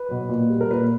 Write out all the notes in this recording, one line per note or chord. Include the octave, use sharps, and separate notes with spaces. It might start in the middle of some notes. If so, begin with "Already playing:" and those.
Already playing: B4
B2 F#3
A#2
G3
A#4
A#2 B4